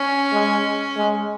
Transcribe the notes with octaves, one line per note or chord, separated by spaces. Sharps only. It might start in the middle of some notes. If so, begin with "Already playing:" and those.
Already playing: C#4
G#3
G#3